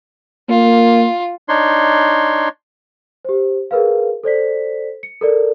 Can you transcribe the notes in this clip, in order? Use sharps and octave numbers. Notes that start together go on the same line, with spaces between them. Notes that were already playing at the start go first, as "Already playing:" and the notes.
A#3 F4
D4 D#4 C#5 C6
G4 C5
G#4 A#4 B4 F5
A4 C5 D5 B6
C#7
A4 A#4 D5